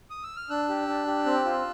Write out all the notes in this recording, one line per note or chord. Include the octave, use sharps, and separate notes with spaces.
D#6
E6
F6
D4 E6 F#6
G4
D4
G4
C4
F4